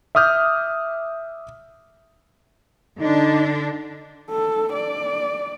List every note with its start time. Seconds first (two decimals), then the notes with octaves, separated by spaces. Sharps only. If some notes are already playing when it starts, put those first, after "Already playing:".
0.15 E5 D6 D#6 F6 G6
3.00 D3 D4 D#4
4.30 A4
4.73 D5